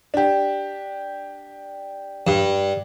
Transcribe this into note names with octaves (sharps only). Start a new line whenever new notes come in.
D4 G4
G2